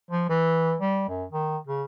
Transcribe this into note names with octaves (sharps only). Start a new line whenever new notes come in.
F3
E3
G3
F#2
D#3
C#3